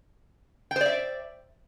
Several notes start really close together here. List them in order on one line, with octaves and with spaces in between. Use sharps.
G5 C5 D5 E5